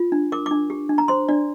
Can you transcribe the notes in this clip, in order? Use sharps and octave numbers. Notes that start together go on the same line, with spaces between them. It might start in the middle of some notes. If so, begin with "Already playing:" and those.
Already playing: F4
D4
A#4 D6
D6
D4
G4
D4
A#5
C5 C6
D4 D5